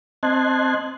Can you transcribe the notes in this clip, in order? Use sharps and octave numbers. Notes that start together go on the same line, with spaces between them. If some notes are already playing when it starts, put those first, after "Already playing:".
C4 D#5 A5 C6 F#6 G#6